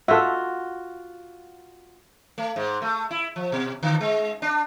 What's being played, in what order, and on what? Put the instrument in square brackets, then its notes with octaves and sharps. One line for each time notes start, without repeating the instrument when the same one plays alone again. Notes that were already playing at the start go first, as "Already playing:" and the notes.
[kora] F4 F#4 [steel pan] A4 E5
[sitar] A3
G#2
A3
E4
F3
B2
D3
G#3
D4